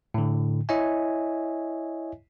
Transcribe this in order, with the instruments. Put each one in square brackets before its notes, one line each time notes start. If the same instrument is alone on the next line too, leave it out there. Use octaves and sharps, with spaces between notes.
[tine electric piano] A2 D3
E4 C#5 D#5 E5 G#5